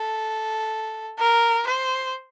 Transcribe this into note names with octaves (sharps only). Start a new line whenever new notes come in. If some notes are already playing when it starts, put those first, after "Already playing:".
Already playing: A4
A#4
C5